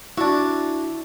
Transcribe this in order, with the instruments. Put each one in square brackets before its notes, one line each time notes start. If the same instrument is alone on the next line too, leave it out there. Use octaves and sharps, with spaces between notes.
[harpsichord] D4 F#4 [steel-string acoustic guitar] E4 A5